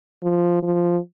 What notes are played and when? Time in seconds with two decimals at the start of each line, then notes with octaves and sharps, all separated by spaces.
0.23 F3
0.63 F3